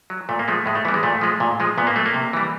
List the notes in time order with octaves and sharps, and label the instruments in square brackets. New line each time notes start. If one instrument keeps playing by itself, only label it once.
[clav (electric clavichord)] F#3
A#2 A3
A#3
F3 G#3 A3
A2 G#3
A3
E3 G3 B3
G#3
A#2 A3
F3 G#3
A#2
F3 G#3
A#2 B3
A#3
F#3 A3
A#3
C3
E3 G3